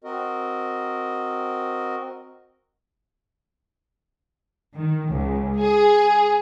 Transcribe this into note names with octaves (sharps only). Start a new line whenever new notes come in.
C4 F#4 A#4 D#5
D#3
C#2
G#4